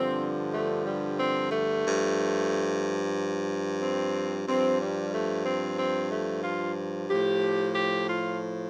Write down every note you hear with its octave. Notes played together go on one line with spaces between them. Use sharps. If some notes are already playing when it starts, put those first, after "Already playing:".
Already playing: G2 D3 F3 C4
A3
G3
C4
A3
G2 F3
C4
G2 F3 C4
G3
A3
C4
C4
A3
F4
A2 F3 G4
G4
F4